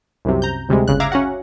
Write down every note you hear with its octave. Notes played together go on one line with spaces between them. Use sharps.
C2 F#2 C3
A#5 G6
D2 C3 G3 G#3
G1 C#3 F#6
E5 F5 A#5 D6 G#6 A#6
C#4 F#4 F#5